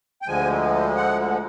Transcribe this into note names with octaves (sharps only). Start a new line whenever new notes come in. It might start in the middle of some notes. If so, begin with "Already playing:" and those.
G5
D2 D3 F3 G#3 G#5
F#5